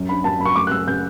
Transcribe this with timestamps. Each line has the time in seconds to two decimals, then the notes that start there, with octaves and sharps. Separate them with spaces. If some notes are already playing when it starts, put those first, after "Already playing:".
Already playing: F#2
0.09 D4 B5
0.24 F#2 A5
0.40 F#2 B5
0.45 C#6
0.56 A3 D6
0.67 F#6
0.71 C#3 E6
0.87 C#3 G6